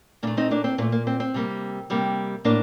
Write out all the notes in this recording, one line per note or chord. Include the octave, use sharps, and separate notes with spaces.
A#2 A3 A#3 D4
C4 D#4
A#3 D4
C4
A#2 A3 A#3
A#3
C4
C4
C3 G3 A#3
C3 G3 A#3
A2 A#3 D4